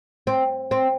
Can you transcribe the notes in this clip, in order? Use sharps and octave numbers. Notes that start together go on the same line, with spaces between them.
C4
C4